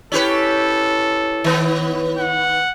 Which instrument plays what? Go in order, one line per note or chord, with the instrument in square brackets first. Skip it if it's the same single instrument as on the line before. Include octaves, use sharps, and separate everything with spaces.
[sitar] C#4 G4 B4 [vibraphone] E4 C#5 [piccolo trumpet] A4
[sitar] D#3 B3
[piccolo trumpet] F#5